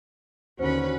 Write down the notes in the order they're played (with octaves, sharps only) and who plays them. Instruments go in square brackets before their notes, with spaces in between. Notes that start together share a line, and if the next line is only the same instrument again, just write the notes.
[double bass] D#2 D3 [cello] C#4 B4 [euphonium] F#4 [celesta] C5